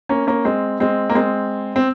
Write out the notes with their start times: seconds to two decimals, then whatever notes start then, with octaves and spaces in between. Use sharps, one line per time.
0.09 A#3 C#4
0.27 A#3 C#4
0.45 G#3 C4
0.80 G#3 C4
1.10 A#3
1.15 G#3 C4
1.76 C4